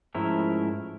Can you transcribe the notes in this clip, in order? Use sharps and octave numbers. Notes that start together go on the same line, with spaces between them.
G#2 F3 A3 C#4 E4 A#4